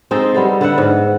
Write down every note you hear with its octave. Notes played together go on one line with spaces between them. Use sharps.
G#3 C4 D#4 A4
G3 B3 A4
D3 B4 E5 F#5
G#2